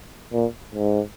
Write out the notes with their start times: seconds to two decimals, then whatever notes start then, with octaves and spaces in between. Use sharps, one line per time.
0.33 A#2
0.75 G#2